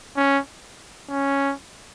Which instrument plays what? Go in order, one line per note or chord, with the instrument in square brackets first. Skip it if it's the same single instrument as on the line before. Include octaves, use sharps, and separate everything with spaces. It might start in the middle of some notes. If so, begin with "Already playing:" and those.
[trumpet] C#4
C#4